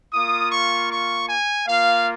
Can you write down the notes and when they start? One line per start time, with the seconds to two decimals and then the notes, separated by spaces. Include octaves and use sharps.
0.13 A#3 F4 D#6
0.51 C#6
0.90 C#6
1.29 G#5
1.68 A#3 F4 F5